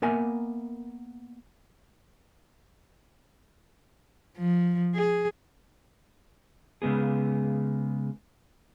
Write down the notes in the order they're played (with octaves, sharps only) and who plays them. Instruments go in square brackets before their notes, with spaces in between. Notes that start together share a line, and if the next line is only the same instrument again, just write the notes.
[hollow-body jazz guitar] A#3 B3 A#4 E5 G#5
[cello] F3
G#4
[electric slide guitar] C#3 G#3 B3 G#4